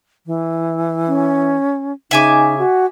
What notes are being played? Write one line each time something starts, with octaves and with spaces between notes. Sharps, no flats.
E3
C#4
C#3 D#4 E5 G#5 D6
F#4